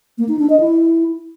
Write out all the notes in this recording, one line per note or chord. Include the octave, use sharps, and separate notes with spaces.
A#3
D#4
D4
D#5
E4